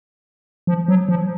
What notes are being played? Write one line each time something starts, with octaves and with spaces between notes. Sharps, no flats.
F3
F#3
F3